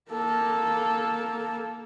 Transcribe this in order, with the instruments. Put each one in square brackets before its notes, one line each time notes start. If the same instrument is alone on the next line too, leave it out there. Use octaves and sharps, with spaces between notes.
[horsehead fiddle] A#3 A4